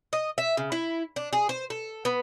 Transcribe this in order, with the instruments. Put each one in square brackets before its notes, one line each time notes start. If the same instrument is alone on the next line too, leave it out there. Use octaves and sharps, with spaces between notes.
[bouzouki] D#5
E5
C#3
E4
D4
G#4
C5
A4
B3